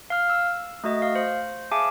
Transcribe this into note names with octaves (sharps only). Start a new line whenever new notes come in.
F5 F6
E6
A3 F#4 D#5
F5
C5
G#4 E5 F5 G#5 A5 D6